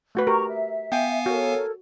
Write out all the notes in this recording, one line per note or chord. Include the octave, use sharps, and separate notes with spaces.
A3 F#4 B4
G4 A#4 A#5 C#6
E5
B3 F5 G5 G#5
F#4 A4 A#4 C#5